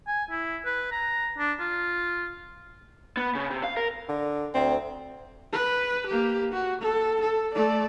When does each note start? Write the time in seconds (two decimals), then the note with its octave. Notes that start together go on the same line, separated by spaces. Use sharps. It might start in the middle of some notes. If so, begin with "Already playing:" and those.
0.07 G#5
0.31 E4
0.66 B4
0.92 A#5
1.38 D4
1.60 F4
3.17 B3
3.35 C#3
3.50 C3
3.63 F5
3.77 A#4
4.09 D3
4.54 D2 C4
5.53 B4
6.07 A#3 G4
6.53 F#4
6.81 A4
7.21 A4
7.54 A3 D5